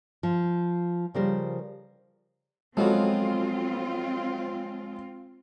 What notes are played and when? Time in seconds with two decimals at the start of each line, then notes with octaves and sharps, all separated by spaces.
0.23 F3
1.14 C#3 F3 G3 A#4 C5
2.77 F3 F#3 G#3 B3 C4 F4 F#4 A4